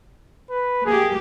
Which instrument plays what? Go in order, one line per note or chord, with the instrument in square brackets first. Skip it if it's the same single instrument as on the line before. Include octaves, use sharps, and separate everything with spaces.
[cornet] B4
[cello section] A#3 G4 [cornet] G#4